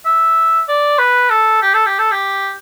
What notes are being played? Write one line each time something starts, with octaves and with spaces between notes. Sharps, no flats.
E5
D5
B4
A4
G4
A4
G4
A4
G4